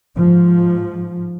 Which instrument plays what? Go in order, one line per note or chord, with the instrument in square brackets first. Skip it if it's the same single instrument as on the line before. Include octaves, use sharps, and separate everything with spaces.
[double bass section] G#2 F3